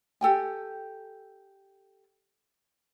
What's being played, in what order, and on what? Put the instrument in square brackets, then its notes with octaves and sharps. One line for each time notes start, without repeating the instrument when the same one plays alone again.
[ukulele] G4 A4 G5 G#5